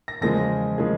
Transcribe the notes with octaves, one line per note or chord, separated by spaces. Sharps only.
A#6
E2 C#3 F3 G#3 A#6
C#3 F3 G#3